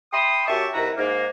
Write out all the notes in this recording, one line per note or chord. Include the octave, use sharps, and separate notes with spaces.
E5 G5 B5 C6 D#6
F#2 G4 E5 A5 C#6
C2 D#3 E4 F#4 B4 A#5
G#2 A#3